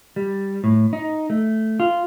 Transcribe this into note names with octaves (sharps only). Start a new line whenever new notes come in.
G3
A2
D#4
A3
F4